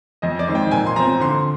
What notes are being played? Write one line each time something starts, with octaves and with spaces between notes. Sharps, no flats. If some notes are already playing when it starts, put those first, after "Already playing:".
F2 D#5
D5
D#3 G#3 C4
G5
A#2 G#5
C6
F3 C4 A#5
D3 C6